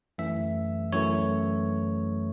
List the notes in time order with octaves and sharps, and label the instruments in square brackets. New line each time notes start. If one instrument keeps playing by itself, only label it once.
[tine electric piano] F#2 E3 A3 E5
F#2 E3 A3 C#5